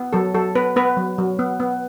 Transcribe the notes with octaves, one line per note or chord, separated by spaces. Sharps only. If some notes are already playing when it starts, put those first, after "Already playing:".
Already playing: B3
F#3 A4
F#3 A4
B3 B4
B3 B4
F#3
F#3
B3
B3